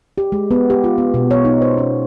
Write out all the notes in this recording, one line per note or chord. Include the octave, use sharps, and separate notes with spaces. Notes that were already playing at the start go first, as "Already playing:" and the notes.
G4
G#3
B3
G4
F4
B3
B2
C#5
D#4
C5
C#4